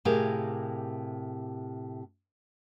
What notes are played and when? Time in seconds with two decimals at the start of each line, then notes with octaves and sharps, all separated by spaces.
0.05 A2 C3 G4 G#4 A#4 F5